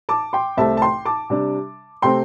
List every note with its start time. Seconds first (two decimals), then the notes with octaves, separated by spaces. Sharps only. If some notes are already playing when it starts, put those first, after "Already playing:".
0.09 A5 D6
0.33 G5 C6
0.57 C2 C3 A3 C4 E5 A5
0.77 A5
0.82 G5 C6
1.06 A5 D6
1.30 C3 G3 D4
2.02 C3 A3 C4 G5 C6